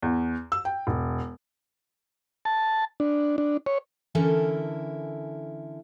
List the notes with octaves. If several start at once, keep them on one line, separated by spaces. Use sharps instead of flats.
E2
E6
G5
E1
A5
D4
D4
C#5
D3 E3 C#4 E4 A4 A#4